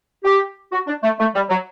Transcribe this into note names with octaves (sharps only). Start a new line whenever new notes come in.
G4
F#4
D4
A3
A3
G3
F#3